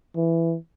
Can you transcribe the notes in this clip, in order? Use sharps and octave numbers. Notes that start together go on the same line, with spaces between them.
E3